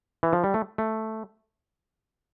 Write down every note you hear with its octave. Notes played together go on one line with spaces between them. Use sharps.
E3
F3
G3
A3
A3